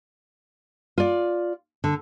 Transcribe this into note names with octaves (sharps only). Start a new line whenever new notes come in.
F4 D5
D3